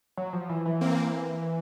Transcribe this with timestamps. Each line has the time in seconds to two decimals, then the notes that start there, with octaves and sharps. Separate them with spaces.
0.17 F#3
0.33 F3
0.49 E3
0.65 E3
0.81 A#3 C4